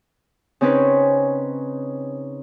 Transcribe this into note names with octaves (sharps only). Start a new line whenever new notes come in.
C#3 C4 C#4 D#4 B4